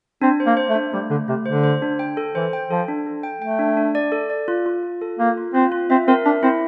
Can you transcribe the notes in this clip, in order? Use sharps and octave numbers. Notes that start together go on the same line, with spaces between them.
C4 D4
C5
A#3
C5
A3
D4
G3 A3
D3 A3
C3 A3
D3 C5
C5
D4
G5
A4
E3 C5
G5
F3 A4
D4
A4
G5
A3 G5
D4
D4
D5
A4
D5
F4
F4
F4
A4
A#3 F4
F4
C4 F4
F4
C4 E5
C4 A#4
D4 E5
C4 E4